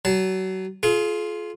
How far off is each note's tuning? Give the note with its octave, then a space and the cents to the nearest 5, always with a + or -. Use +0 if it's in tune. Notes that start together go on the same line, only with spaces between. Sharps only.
F#3 +30 A5 +0
F4 +0 G#4 +40